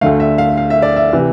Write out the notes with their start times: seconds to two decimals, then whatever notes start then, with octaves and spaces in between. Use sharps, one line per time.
0.01 D2 D3 A3 F5
0.20 E5
0.38 F5
0.57 F5
0.70 E5
0.82 D5
0.96 E5
1.13 C3 E3